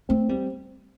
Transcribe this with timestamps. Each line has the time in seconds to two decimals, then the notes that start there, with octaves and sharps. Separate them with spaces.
0.09 A3 C4
0.29 G3 C4